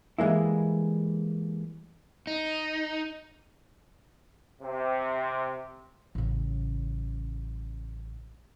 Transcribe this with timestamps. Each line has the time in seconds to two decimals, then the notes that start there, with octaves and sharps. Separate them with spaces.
0.18 E3 G3 G#3 A#3 E4
2.27 D#4
4.62 C3
6.15 A1 C#3